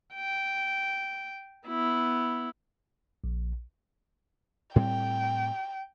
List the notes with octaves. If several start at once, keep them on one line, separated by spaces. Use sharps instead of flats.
G5
B3 E4
A#1
A2 G3 C4 G5